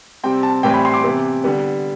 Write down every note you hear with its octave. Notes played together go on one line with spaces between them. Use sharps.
C3 G3 C4 G5
A5
A2 E3 G3 C4 G5
B5
C6
D6
C3 E3 B3
D3 G3 B3